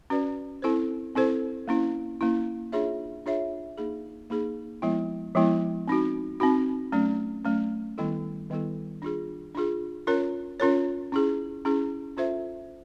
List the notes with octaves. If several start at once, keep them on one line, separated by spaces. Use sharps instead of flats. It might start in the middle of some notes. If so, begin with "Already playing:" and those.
C#4 F#4 B4 D5
C4 E4 A4 C5
C4 E4 A4 C5
A#3 C#4 E4
A#3 C#4 E4
D4 F4 G#4 C#5 E5
D4 F4 G#4 C#5 E5
A#3 D#4 G#4
A#3 D#4 G#4
F3 G#3 B3 E4
F3 G#3 B3 E4
C4 D#4 F#4
C4 D#4 F#4
F#3 A3 C#4
F#3 A3 C#4
D#3 G3 B3 E4 A4
D#3 G3 B3 E4 A4
D4 F4 G#4
D4 F4 G#4
C#4 F4 A#4 C#5
C#4 F4 A#4 C#5
C#4 E4 G#4
C#4 E4 G#4
C#4 F4 A4 C5 E5